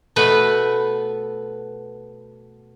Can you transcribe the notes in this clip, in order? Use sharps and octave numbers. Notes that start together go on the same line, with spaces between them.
B2 A3 B3 B4